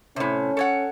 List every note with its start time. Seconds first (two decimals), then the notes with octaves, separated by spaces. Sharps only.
0.16 A2 C3 C#4
0.57 A4 C#5 F#5